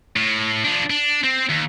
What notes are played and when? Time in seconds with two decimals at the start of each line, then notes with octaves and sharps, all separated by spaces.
0.17 A2
0.65 F3 D4
0.90 D4
1.23 C4
1.49 D#2